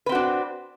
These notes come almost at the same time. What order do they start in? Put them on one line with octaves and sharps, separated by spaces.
B4 C4 F#4 D4